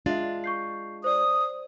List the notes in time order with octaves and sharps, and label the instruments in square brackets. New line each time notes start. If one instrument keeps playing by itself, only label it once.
[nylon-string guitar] G#3 D4 F4 [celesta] E5 A6
[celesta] C#6 G6 C7
[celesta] C5 D5 [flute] D#6